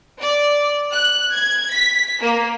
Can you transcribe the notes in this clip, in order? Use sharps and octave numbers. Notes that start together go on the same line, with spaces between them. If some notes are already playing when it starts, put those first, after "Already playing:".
D5
F#6
G#6
B6
A#3